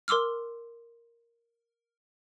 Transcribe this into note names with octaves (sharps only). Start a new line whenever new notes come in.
A#4 C6 D6 E6 F6